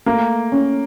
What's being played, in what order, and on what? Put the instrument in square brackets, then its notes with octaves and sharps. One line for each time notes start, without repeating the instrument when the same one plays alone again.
[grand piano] A3 [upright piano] A#3
[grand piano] C#4